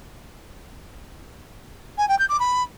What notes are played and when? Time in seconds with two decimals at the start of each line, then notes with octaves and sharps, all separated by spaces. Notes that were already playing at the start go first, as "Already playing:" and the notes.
1.98 G#5
2.08 G5
2.19 G6
2.29 D6
2.39 B5